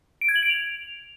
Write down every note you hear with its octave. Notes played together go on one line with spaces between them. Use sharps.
D7
G#6
F#7
D7
F7